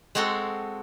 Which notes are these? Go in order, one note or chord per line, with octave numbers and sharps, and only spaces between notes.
G#3 C4 F#4 A4